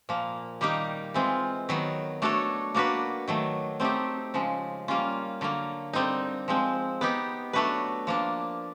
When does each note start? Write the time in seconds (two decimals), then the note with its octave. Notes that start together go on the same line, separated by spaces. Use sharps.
0.09 A#2 F3 A#3
0.61 D#3 G3 A#3 D#4 G4
1.14 E3 G#3 C4 F4
1.69 D#3 F#3 B3
2.22 A3 D4 F#4 A4 C#5
2.74 A#3 D4 F#4 B4
3.28 D#3 F#3 A3
3.80 A3 C4 D#4 G4
4.34 C#3 F3 G#3
4.88 G3 A#3 C#4 F4
5.41 D3 F#3 A#3
5.93 D3 G3 C4 D#4
6.48 F3 G#3 C4
7.01 B3 D#4 G4
7.53 F#3 A3 D4 F#4 B4
8.07 F3 A#3 D4